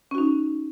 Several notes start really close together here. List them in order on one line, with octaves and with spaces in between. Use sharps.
C#4 F#4 D#4